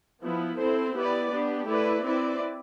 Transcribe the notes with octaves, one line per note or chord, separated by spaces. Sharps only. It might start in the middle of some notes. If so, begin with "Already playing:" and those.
F3 B3 E4
C4 E4 A4 C5
B3 E4 G4 B4 D5
B3 D4 G4
A3 E4 B4 D5
C4 E4 B4 D5